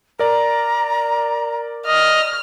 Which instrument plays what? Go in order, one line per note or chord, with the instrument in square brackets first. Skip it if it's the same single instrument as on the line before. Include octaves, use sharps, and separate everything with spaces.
[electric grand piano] A#4 D5 [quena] A#5
[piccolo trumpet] D#5 [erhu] F6